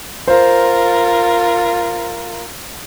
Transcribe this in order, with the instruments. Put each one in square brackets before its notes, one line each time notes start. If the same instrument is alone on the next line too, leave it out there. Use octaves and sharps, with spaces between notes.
[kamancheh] F4 A#4 [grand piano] C5